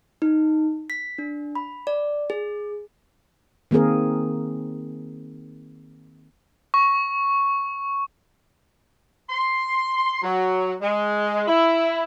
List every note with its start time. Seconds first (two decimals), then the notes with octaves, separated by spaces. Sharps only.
0.22 D#4
0.90 B6
1.18 D4
1.55 B5
1.87 D5
2.30 G#4
3.71 D#3 A#3 C4 G#4 A#4
6.74 C#6
9.30 C6
10.23 F#3
10.82 G#3
11.48 E4